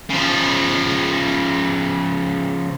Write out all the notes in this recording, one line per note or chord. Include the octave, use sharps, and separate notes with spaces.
C#3 F3